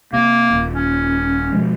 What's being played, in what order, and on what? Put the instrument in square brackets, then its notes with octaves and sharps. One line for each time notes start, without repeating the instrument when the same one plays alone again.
[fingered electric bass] C3 [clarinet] A#3
[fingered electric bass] D#1
[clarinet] C#4
[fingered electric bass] B2 F3 G#3